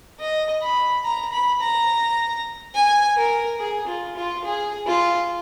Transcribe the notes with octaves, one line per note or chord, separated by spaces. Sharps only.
D#5
B5
A#5
B5
A#5
G#5
A#4
G#4
F4
F4
G#4
F4